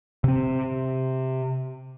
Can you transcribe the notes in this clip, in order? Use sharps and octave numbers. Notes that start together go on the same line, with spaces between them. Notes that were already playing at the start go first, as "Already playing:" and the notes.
C3 C4